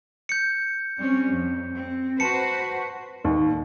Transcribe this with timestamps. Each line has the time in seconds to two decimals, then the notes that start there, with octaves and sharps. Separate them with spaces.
0.29 G6 C#7
0.97 G3 C4 C#4
1.29 F2
1.75 C4
2.20 F#4 B4 C5 A5 C#7
3.24 D#2